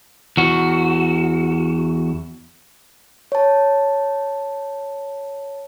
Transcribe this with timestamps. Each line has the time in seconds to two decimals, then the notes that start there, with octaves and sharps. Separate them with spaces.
0.37 E2 F#4
3.32 C#5 A5